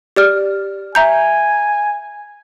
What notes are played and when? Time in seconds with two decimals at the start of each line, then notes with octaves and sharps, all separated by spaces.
0.16 G4 D5 F6
0.95 E5 G#5 A#5 G6